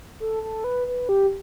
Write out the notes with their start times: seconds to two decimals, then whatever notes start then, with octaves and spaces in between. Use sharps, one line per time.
0.20 A4
0.43 A4
0.64 B4
0.87 B4
1.09 G4